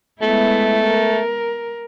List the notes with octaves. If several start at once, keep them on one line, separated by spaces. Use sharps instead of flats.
G#3 A3 B3 E4
A#4